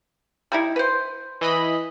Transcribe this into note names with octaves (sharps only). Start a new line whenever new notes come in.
G3 D#4 E4
B4 C5
E3 D#5 B5